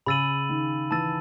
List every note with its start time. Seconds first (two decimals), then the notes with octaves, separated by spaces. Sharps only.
0.06 C#3 B5 E6 A6 D#7 F#7
0.49 D#3
0.91 E3 A5 E6 A6 D#7